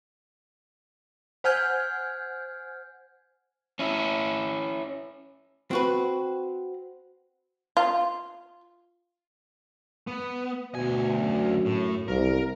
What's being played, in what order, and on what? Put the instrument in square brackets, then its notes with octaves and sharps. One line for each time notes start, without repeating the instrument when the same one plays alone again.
[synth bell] C5 F#5 G#5 F6 G6 G#6
[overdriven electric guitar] C#4 E4
[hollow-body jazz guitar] C4 F#4 B4
[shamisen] F4
[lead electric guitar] B3
[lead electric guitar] D2 G#5 [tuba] B2
[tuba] F#2
[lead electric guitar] A2
[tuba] C2 [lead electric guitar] A#4